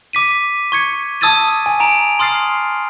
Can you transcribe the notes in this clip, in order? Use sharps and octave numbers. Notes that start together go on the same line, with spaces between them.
D6 B6 D#7
C#6 G#6 C#7
A5 D#6 E6 G#6 A6 D#7
G#5
G#5 A#5 D7 F7
C6 D#6 F6 A6 C7